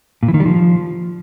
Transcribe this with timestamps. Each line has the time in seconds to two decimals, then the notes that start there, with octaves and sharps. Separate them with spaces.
0.23 A#2
0.28 E3
0.34 D#3
0.40 G3
0.46 F3